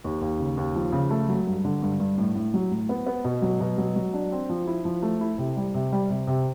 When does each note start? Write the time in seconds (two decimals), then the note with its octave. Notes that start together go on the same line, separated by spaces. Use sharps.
0.04 D#2
0.21 D#2
0.39 C#3
0.57 D#2
0.75 F3
0.92 C#3
1.10 A3
1.29 F#3
1.47 G2
1.65 D3
1.83 G2
2.00 G2
2.18 A2
2.35 A2
2.54 F#3
2.71 A2
2.89 B3
3.06 B3
3.24 B2
3.42 F#3
3.60 B2
3.78 F#3
3.96 F#3
4.14 D4
4.32 C4
4.50 F3
4.67 E4
4.85 F3
5.02 A3
5.21 E4
5.38 C3
5.57 G3
5.74 C3
5.92 G3
6.10 C3
6.27 C3